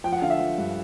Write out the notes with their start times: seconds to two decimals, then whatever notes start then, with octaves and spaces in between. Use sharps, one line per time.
0.04 F3 G5
0.13 F#5
0.22 D3 F5
0.30 E5
0.39 F3
0.58 G2